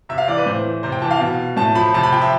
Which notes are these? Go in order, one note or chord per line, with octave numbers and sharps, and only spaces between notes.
C3 E5
F5
E3 D5
B4
A2 C5
E3
C3 C5
G5
E3 A5
F5
B2
A2 A5
F3 B5
C3 A5
B5
F3 G5
E5